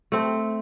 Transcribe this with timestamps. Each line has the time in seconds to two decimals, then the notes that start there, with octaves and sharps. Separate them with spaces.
0.12 A3 C4